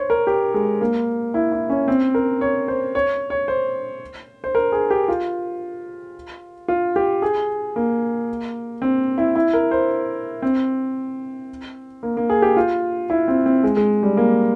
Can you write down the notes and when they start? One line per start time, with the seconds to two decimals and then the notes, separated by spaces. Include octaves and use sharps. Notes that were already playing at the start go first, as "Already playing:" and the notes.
Already playing: C5 C#5
0.10 A#4
0.27 G4
0.54 G#3
0.81 A#3
1.34 E4
1.52 E4
1.70 C#4
1.88 C4
2.14 A#4
2.41 C#5
2.68 C5
2.95 C#5
3.30 C#5
3.48 C5
4.44 C5
4.55 A#4
4.72 G#4
4.90 G4
5.08 F4
6.68 F4
6.96 G4
7.22 G#4
7.76 A#3
8.82 C4
9.18 E4
9.36 E4
9.54 A#4
9.71 C5
10.42 C4
12.03 A#3
12.17 A#3
12.30 G#4
12.42 G4
12.57 F4
13.10 E4
13.28 C4
13.46 C4
13.64 G#3
13.77 G#3
14.03 G3
14.17 A#3